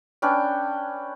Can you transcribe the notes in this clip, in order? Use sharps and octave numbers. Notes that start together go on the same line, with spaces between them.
C#4 D4 B4 G5